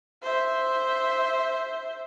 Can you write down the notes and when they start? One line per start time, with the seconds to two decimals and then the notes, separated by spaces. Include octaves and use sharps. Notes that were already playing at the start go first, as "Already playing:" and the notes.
0.22 C5 E5